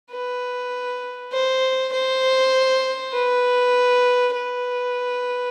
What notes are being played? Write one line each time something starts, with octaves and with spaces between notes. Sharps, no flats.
B4
C5
C5
B4
B4